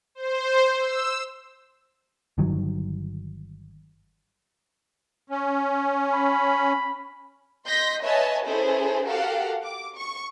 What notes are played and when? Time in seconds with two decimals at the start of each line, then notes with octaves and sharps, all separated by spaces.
0.15 C5
0.79 E6
2.38 G1 G2 D#3 F#3
5.30 C#4
6.13 B5
7.66 D#5 C6 G6 A#6 B6
8.03 B4 C#5 D#5 E5 G#5 A5
8.46 C#4 E4 G#4 A4 B4 C5
9.06 F#4 G4 A4 A#4 F5 F#5
9.64 D6
9.96 C#6